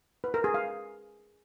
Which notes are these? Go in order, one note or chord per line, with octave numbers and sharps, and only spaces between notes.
B4
A#4
G#4
F5